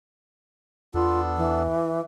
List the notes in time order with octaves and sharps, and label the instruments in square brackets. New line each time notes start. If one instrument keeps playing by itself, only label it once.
[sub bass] E2 [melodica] B3 D4 A4 [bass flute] F4
[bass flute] E3